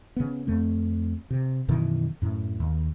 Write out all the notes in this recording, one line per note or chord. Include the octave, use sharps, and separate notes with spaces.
C#3 B3
F2 A3 C4
C3
F#2 B2 D#3 E3
F#2 A2
D#2